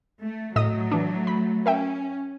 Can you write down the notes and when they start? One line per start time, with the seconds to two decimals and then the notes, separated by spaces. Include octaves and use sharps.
0.22 A3
0.56 A2 F#3 A3 D#5 D#6
0.92 E3 D4
1.27 B5
1.66 C#4 A#4 E5 G5